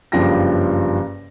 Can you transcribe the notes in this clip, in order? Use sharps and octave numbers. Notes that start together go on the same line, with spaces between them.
F#1 G2 F3 G4 G5 A#6